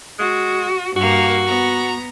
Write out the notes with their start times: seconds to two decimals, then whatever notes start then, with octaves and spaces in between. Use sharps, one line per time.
0.19 G#3 F#4
0.97 G2 A#3 F#4
1.46 B3 A#5